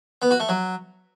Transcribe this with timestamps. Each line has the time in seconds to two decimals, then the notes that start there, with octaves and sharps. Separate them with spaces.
0.22 B3
0.31 F#4
0.40 A3
0.49 F#3